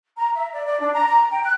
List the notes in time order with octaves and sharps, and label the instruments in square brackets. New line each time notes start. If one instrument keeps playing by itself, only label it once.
[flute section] A#5
E5
D5
D5
D4
A#5
A#5
G5
F#6